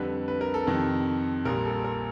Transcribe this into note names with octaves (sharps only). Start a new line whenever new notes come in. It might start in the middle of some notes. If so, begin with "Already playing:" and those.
Already playing: F2 D3 G3 B4
B4
A#4
A4
F2 C3 D#3
A#1 A#2 G3 A#4
A4
A#4